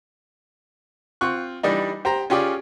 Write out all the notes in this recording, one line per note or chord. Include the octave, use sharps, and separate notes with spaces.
C4 F4 C#6 F#6
E3 G3 D4 D#4
G4 C5 G5 A#5
C#4 F4 G4 G#4 D5